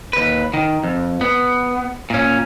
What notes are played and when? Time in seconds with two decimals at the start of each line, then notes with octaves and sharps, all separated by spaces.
0.13 D#2 B4
0.54 D#3
0.84 F2
1.21 B3
2.10 A#2 C#4